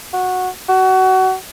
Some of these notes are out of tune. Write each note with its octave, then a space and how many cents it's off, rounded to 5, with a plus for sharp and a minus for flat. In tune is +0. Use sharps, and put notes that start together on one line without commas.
F#4 -10
F#4 +25